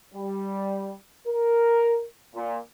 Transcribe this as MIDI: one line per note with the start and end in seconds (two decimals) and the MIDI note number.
0.14 0.94 55
1.28 2.05 70
2.34 2.58 46